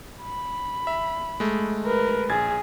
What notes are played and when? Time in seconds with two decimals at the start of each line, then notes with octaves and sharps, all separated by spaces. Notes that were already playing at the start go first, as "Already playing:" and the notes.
0.22 B5
0.87 E5
1.40 G#3 A3
1.86 A#4 B4
2.29 A#1 G#4 G#6 A6